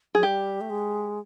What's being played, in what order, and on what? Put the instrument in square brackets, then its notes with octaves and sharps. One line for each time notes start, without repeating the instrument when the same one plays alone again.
[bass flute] F#3 [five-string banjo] G#4
[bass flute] G3 [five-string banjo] G4
[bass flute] A3
G#3